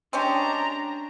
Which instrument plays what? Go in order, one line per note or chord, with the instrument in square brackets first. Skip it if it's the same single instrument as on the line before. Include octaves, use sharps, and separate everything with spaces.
[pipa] G#3 C#4 G4 [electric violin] D4 A#5